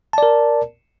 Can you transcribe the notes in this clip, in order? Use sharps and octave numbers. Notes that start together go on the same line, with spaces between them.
A#4 D5 A5